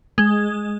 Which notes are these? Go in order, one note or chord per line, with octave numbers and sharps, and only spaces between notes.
G#3